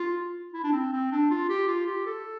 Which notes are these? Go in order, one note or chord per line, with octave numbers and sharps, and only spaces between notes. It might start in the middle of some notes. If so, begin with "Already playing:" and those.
Already playing: F4
E4
D4
C4
C4
D4
F4
G4
F4
G4
A4